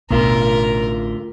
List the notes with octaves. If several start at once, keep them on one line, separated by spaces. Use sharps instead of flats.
A1 D2 B2 D3 A3 F4 A#4